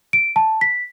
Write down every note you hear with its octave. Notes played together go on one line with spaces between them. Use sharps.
D7
A5
B6